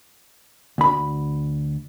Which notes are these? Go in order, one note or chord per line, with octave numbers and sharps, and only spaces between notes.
D2 B5